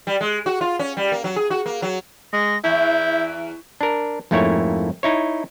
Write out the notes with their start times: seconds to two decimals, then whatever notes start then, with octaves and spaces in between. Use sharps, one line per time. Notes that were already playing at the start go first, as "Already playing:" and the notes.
0.07 G3
0.21 G#3
0.46 F#4
0.61 F4
0.79 C#4
0.97 G3
1.12 A#3
1.24 F#3
1.36 G#4
1.50 F#4
1.66 A#3
1.82 F#3
2.33 G#3 A#6
2.64 E2 E4 G6
3.81 D4 A#4
4.31 F2 G#2 A3 A#3 E4 C#5
5.03 D#4 E4 C#5